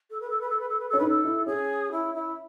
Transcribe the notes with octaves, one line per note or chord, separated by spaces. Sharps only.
A4
B4
A4
B4
A4
B4
A4
B4
C#4 A4
D#4 B4
A4
E4
C#4 G#4
E4
E4